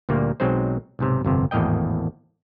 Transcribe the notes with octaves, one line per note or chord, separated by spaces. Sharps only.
D2 A#2 G3 A#3
B1 F#3 G#3 C4 D#4 C5
B1 G#2 C3
G1 F2 C3
G#1 E2 A2 A#3 D#5 G5